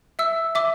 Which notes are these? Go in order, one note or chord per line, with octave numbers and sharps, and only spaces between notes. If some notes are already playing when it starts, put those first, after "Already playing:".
E5 E6
E5 D6